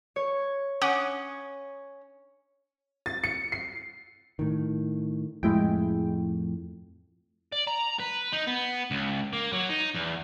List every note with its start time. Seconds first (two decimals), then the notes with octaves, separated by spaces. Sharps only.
0.16 C#5
0.82 C#4 F#5 D6 D#6
3.06 A6
3.24 C#7
3.52 C7
4.39 A2 D#3
5.43 F2 A2 G#3 E4 G5
7.52 D5
7.67 A#5
8.00 B4
8.33 D#4
8.47 B3
8.91 C#2
9.33 A#3
9.53 F#3
9.69 D#4
9.94 E2